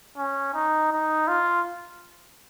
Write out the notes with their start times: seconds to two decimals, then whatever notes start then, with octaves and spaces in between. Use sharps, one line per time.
0.17 C#4
0.54 D#4
0.92 D#4
1.28 F4